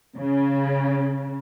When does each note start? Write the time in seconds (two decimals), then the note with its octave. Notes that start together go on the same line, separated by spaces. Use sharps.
0.17 C#3